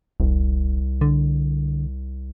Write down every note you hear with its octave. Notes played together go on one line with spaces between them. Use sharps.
E1 C2
D3